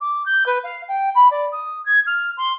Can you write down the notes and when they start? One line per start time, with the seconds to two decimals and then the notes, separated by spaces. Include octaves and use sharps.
0.01 D6
0.26 G6
0.46 B4
0.64 F5
0.88 G5
1.15 B5
1.31 D5
1.52 D#6
1.86 G#6
2.07 F6
2.37 C6